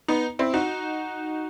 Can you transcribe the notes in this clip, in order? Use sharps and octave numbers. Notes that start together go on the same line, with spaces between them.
B3 D#4
C4 E4
D#4 F#4